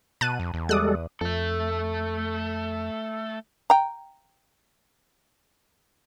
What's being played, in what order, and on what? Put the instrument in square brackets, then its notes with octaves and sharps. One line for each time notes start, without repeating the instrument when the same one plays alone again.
[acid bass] B2 [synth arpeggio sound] A5 F#6 D#7
[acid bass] F2
E2
[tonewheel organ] G3 G#3 A4 [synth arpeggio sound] D6 D#6 F#6
[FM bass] F2 [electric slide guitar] A3 A4
[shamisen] G5 A#5